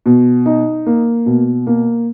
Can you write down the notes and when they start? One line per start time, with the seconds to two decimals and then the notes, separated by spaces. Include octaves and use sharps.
0.06 B2
0.46 D#4
0.86 A#3
1.26 B2
1.67 A#3